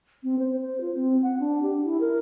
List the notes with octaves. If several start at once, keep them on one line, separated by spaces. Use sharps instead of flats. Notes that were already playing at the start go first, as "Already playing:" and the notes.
C4
C5
C5
F4
C4
F#5
D4
G4
E4
A#4